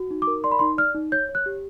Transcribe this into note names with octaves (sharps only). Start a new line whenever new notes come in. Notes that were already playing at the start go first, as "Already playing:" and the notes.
Already playing: F#4
D#4
D6
A#4
D5 C6
B5
D#4 C6
D5 F6
D#4
C#5 G6
C#5
F#6
G4